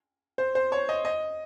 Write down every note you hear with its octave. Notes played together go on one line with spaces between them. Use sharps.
C5
C5
C#5
D#5
D#5